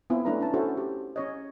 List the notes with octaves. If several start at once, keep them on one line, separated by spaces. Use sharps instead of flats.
B3 C4 E4 F4
A3 C#4 D4 E4 B4 A#5
C#4 A5
C#4 E4 F#4 A4 C5
G4
C#4 C#5 D#5